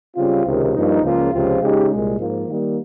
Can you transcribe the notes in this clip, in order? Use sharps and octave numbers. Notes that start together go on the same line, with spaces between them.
C#3 G3 C4 F4
C#2 C3 D#3
G2 F3 A#3 D#4
C#2 C#3 F3 A#3 F4
C#2 C3 F3 C4 F4
C#3 G#3 D#4 G4
C2 A#2 G#3
G#2 F3 A#3 F4
D#3 G3 A#3